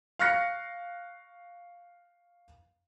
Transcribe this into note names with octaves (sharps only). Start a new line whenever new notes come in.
F5 C#6 F6 F#6 A#6 C#7